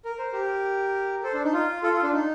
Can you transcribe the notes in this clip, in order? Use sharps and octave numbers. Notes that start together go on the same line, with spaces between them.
A#4
C5
G4 A#4
A4 C5
D4
D#4
F4
F4 A4
F4
D4
D#4